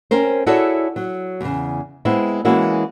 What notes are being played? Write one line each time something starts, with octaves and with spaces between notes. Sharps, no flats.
C4 C#4 A#4 C5
E4 F#4 G#4 A4 C#5 D5
F#3
E2 C#3
G#3 B3 C4 E4
E3 G#3 A#3 C#4 E4 F#4